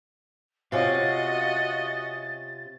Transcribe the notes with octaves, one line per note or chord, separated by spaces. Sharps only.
C3 C#4 F4 F#4 D#5 F5 A6